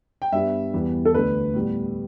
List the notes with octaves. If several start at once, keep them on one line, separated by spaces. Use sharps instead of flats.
G5
G2 G3 B3 E5
E2 E3 G3 B3
A4
D2 D3 A3 B4
A2 G3 B3